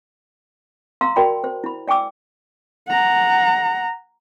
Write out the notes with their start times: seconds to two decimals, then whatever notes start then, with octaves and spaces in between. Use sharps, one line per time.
1.01 F5 A#5 C6 E6
1.16 F#4 A#4 D5 G5 A5 B5
1.44 C5
1.64 E4 B5
1.88 D5 G5 G#5 D6 E6
2.88 F#5 A#5